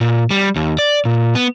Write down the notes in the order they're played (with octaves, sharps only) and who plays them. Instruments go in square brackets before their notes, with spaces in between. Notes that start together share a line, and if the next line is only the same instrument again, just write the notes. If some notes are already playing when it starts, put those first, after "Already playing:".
[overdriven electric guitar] A#2
G3
D#2
D5
A#2
B3